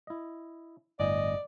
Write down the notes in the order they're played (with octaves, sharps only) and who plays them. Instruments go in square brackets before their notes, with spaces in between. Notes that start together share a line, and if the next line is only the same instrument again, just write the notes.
[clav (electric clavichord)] E4 D#5
[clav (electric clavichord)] G1 A2 G#5 [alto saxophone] D5 [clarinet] D#5